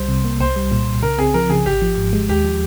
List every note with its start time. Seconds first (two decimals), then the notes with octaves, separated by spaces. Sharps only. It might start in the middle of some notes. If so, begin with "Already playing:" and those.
Already playing: C2 G3 C5
0.08 C3
0.24 A#3
0.40 C2 C5
0.56 G3
0.72 A#2
0.87 C2
1.03 C#3 A#4
1.18 C4 G#4
1.34 F3 A#4
1.50 C#3 G#4
1.66 G#1 G4
1.82 F3
1.97 G#2
2.13 G#3
2.29 D#2 G4
2.44 F3